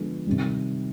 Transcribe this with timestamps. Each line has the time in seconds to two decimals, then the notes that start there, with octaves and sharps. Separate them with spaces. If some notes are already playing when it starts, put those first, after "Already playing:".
Already playing: D3 F3 G#3 B3
0.27 C3 D#3 G3